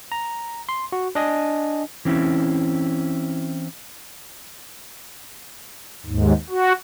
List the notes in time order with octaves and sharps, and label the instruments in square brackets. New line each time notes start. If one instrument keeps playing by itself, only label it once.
[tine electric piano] A#5
C6
F#4
D4 D#5 G#5
[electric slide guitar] E3 C4 C#4 E4
[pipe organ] D#2 G#2
F#4